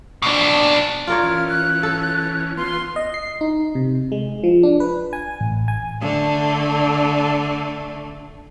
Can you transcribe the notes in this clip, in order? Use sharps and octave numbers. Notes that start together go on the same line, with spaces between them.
B2 D4
F4 A#4 C#5 D5
E3 C#4 F6
F#6
A4
B3 F4 C6
D#5
C7
D#4
C3
G#3
F3
D4
B4
G#5
A1
G#5
D3 A3